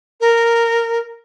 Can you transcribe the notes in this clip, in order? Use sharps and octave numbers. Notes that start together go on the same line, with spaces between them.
A#4